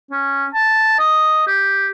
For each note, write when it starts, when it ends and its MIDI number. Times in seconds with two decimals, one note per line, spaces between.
0.11 0.47 61
0.54 0.95 81
0.99 1.44 75
1.47 1.89 67